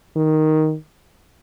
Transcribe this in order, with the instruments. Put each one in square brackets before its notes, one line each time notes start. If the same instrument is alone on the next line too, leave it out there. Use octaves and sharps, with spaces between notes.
[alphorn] D#3